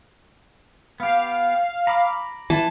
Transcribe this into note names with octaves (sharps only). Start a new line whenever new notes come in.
B3 G4 F5
A#5 B5 D6
E3 A5